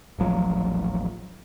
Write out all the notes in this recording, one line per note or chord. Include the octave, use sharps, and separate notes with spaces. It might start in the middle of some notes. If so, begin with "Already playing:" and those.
D#1 A1 F3 F#3